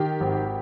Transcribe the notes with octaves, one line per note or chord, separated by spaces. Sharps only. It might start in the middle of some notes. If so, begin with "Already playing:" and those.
Already playing: D#3 G4
G#1